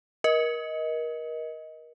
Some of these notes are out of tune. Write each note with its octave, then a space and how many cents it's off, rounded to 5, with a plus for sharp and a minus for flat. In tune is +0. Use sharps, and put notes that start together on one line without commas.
A#4 +30 D#5 +15